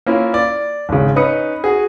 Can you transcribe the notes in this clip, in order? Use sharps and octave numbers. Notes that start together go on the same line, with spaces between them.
A#3 C#4 E4 F4
D5
G#1 C#3
C#4 D#4 B4 D#6 C#7
F#4 G#4